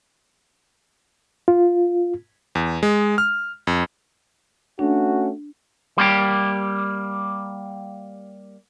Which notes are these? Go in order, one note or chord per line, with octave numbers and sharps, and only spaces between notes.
F4
E2
G#3
F6
F2
A3 C#4 D4 F#4
G3 A#3 G4